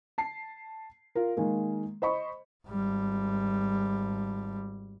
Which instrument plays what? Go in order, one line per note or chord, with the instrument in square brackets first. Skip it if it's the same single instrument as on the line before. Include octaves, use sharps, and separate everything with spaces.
[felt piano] A5 C7
F4 A#4
D#3 G#3 A#3
C5 D#5 B5 C#6
[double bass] G#1 G3